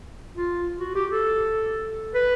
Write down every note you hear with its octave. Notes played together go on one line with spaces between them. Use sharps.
F4
F#4
G4
A4
B4